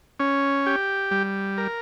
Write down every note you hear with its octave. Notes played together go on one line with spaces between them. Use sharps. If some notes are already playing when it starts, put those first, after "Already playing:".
C#4
G4
G3
A#4